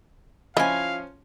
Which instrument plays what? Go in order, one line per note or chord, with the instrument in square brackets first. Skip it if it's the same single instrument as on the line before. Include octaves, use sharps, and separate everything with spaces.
[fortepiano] F3 C#4 [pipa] E4 G#5 [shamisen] F4 D#5 [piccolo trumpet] F5